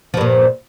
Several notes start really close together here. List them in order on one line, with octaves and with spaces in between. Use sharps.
F3 G2 A#2